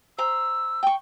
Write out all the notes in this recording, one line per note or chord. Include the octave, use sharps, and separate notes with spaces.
C5 A#5 E6
G5 C#6